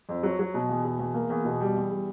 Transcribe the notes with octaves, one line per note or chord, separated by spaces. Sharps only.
F2
F#3
F#3
B2
E2
B2
E2
A#3
E2
B2
G3
E2
G3